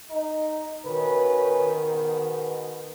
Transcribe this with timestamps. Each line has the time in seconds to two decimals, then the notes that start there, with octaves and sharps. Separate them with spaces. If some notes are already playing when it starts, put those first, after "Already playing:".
0.10 D#4
0.86 D#3 C#4 F#4 B4
1.75 G#2 B2 B3